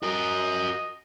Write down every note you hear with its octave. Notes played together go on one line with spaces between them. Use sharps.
F#4 A#4 D#5